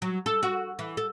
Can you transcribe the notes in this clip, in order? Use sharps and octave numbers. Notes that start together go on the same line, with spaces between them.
F#3
A4
F#4
E3
A4